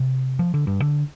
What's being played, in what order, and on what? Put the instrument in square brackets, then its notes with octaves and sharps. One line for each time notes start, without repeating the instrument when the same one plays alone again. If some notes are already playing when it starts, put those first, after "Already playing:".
Already playing: [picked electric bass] C3
F3
D3
G2
D3